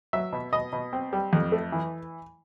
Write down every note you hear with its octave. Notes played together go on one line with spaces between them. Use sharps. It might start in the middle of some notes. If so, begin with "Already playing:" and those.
F#3 E5
B2
B2 D#5
B2
C4
G3
F2
A3
E3